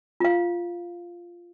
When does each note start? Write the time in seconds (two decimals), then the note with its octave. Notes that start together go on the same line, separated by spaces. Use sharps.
0.20 F4 F5